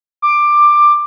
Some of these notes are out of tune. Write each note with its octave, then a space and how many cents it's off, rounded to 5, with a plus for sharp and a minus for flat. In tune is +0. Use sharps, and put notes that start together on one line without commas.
D6 +15